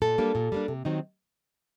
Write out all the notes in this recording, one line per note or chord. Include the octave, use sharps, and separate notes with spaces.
A#2 A4
G3 A#3 D4
A#2
G3 A#3 D4
C3
D#3 F#3 C4 D#4